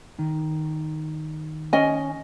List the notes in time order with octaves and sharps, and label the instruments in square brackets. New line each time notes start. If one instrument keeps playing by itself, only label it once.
[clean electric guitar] D#3
[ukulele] C#4 D#5 G#5